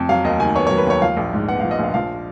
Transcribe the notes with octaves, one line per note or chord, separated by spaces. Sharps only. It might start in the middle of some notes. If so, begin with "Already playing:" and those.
Already playing: F2
F#3 F5
D#2 D#5
D#3 G#5
B3 C#5
C#5
F#3
B4
D#2 C#5
F3 F5
A#1
G#2
B3 F#5
F5
F3
D#5
A#1 F5
F3 F5